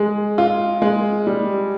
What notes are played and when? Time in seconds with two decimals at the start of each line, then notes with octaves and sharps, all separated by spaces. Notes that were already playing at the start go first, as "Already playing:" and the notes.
Already playing: G#3
0.38 F4
0.82 G#3
1.27 G3